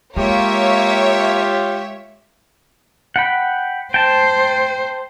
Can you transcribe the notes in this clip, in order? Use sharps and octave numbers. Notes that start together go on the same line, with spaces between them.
G#3 A#3 F4 G4 C#5 E5
F#5 G5 B5
C5 G5 A5